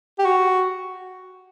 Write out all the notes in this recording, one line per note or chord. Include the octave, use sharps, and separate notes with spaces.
G4
F#4